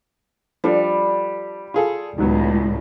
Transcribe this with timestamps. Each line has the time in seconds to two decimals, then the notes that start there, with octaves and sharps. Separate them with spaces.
0.64 F3 G3 D4 A4
1.74 F4 G#4 A4
2.18 C#2 A2 D#3 F#3 B3